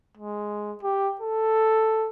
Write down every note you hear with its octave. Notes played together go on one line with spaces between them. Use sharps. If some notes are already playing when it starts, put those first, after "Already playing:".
G#3
G4
A4